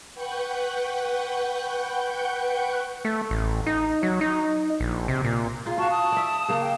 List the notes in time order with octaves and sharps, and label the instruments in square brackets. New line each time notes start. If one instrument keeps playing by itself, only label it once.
[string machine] B4 F#5 G5 C#6 F#6 G6
[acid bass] A3
A1
D#4
F#3
D#4
A#1
C3
A#2
[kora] D#4 F4 G#4
[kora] F4 [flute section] F#4 A5 C#6
[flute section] A5 D#6
[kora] D5 E5
C#3 A#3 A#4
[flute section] G5